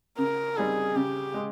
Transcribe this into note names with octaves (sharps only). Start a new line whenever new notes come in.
C#3 A#4
G3 C4 D#4 G#4
C#3 G4
G#3